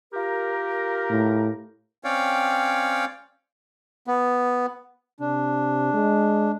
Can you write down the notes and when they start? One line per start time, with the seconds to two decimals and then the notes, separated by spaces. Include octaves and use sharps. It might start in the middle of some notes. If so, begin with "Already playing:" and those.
0.13 F4 G4 A#4
1.10 A2
2.04 C4 C#4 C#5 D5 F5 G5
4.07 B3
5.20 C3 D4
5.94 G#3